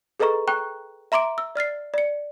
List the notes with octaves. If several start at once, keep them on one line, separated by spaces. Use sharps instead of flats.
G#4 A4 B4 D#5 A#5 C#6
G5 A#5 C#6 F#6
E5 A#5 C6 D6 D7
E6
D5 F6 A6 C7
D5 C#7